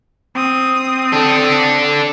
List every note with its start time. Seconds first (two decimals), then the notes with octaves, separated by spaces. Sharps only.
0.35 C4 D#6
1.13 D4 A4